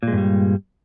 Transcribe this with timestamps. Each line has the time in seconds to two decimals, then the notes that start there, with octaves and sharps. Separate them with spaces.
0.03 A#2
0.08 G#3
0.13 G2
0.18 G3